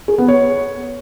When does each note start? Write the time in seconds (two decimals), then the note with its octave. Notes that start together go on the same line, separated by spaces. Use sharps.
0.08 G#4
0.18 B3
0.28 C#5